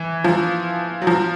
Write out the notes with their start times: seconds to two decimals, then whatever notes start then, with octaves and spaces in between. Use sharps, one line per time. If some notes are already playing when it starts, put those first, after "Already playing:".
Already playing: E3
0.24 F3
1.02 F#3
1.07 F3